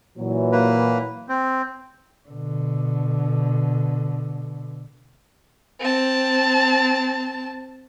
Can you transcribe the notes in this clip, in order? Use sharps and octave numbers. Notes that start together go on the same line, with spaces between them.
A#2 E3 F#3
A#3 B4
C4
B2 D3
C4 A5